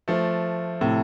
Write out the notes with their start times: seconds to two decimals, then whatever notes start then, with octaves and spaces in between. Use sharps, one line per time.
0.08 F3 A3
0.81 A2 C3